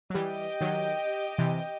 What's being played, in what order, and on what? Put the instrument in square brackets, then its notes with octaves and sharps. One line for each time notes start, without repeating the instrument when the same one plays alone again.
[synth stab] F#3
[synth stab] E3 G3 [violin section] G4 D#5 G5
[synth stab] D#3 F#3
C3 E3